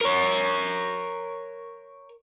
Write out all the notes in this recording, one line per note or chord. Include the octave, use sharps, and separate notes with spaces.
A#4 C#5